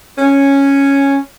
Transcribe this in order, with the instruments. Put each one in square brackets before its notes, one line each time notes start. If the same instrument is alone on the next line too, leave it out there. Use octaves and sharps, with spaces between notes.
[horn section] C#4